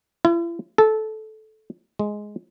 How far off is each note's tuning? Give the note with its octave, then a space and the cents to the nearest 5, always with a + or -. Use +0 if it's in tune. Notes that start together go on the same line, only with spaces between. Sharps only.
E4 +45
A4 -15
G#3 +5